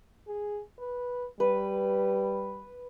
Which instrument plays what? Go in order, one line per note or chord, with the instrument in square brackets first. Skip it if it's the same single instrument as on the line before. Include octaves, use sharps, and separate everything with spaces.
[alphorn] G#4
B4
[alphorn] G3 [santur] B4